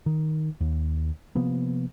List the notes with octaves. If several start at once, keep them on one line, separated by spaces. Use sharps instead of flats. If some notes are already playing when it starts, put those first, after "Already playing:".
D#3
D#2
C3 F3 A#3 B3